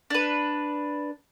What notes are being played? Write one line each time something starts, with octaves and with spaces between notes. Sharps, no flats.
D4 B4